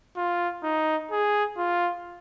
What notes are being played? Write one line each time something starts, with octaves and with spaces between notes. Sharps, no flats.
F4
D#4
G#4
F4